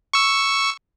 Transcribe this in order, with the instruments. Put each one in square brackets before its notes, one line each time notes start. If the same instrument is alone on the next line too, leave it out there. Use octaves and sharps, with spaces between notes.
[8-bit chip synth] C#6 E6